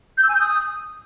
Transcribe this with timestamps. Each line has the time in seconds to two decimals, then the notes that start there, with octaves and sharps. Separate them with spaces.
0.17 G6
0.23 E6
0.29 G#5
0.35 G6
0.40 D#6